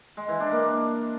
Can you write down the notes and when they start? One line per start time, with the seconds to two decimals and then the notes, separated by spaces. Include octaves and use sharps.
0.17 G#3
0.29 E3
0.40 D4
0.51 A#3